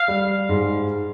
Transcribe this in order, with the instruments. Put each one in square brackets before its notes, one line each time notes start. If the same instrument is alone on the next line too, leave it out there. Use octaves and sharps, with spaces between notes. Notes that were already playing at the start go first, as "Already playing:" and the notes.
Already playing: [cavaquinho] F5
[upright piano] G3
G#2